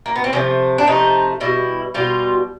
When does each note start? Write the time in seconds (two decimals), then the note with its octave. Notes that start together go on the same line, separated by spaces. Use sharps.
0.06 A#3
0.16 B3
0.24 C4
0.33 C3 F3 A3 C#4
0.78 D4
0.87 C3 F3 A3 D#4
1.40 B2 G3 E4
1.94 B2 G3 F4